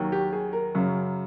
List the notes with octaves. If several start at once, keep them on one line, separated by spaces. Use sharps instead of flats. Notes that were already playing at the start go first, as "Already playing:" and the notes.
Already playing: D#2 D#3 F#3
G4
G#4
A#4
F#2 C#3 F#3